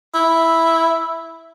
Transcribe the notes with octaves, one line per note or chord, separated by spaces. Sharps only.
E4